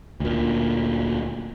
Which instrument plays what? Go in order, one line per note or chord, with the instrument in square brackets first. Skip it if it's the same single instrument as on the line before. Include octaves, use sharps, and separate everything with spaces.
[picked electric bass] D2 A#2